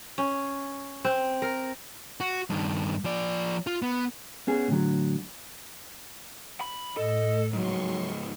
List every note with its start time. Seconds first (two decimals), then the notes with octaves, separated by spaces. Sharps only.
0.18 C#4
1.05 C4
1.42 A#4
2.20 F#4
2.50 G2 D#3
3.04 F3 D5
3.67 F4
3.82 B3
4.47 B3 C#4 G#4
4.68 A2 D3 F#3
6.61 B5
6.97 A2 A4 D#5
7.53 C#2 G#2 F#3 C6 C#6